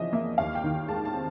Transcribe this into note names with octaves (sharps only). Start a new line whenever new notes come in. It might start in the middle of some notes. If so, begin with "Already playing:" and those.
Already playing: E2 C#3 F3 D#5 E5
A#3 E5
D#2 F5
G5
D#3
G#3 A5
A5
C4